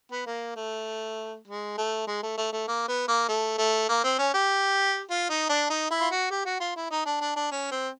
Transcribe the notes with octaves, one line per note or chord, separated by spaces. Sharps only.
B3
A#3
A3
G#3
A3
G#3
A3
A3
A3
A#3
B3
A#3
A3
A3
A#3
C4
C#4
G4
F4
D#4
D4
D#4
E4
F4
F#4
G4
F#4
F4
E4
D#4
D4
D4
D4
C#4
C4